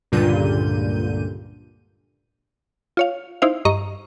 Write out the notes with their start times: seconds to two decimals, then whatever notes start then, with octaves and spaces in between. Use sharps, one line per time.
0.12 C#2 G2 A#2 D3 G6 D#7
2.97 F4 C#5 F5
3.42 D#4 E4 C5 F5
3.65 G2 D#5 A#5 C#6